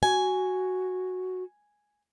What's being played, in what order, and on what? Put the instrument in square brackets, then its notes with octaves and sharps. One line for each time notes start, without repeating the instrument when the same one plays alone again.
[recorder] F#4 [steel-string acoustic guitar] G#5